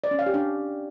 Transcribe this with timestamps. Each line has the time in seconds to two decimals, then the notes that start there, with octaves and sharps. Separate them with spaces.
0.04 D5
0.11 C#4
0.19 F5
0.26 G4
0.34 D4